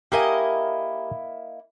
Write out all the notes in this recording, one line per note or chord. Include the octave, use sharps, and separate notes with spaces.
A#3 E4 G4 A#4 D#5 G#5